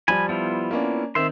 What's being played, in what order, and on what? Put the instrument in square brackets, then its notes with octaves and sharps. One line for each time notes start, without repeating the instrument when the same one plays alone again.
[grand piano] F3 G3 [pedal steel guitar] G#5 B5
[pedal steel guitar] B3 E4 F4
[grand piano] A#3 C#4 D4
[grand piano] D#3 C4 [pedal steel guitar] E5 C6